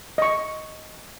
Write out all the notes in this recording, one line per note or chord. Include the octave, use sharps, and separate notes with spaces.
D#5 C#6